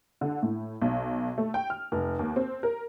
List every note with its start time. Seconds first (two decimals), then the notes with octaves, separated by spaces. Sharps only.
0.21 D3
0.42 A2
0.81 B1
1.38 A3
1.54 G5
1.70 F6
1.92 F1
2.19 D#2
2.36 C4
2.63 A#4